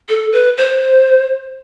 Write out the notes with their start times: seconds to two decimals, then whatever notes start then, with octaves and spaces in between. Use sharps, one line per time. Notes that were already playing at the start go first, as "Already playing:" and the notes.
0.09 A4
0.32 B4
0.57 C5